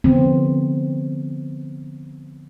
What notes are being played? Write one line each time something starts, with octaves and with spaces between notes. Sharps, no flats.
D3 F3 B3 C4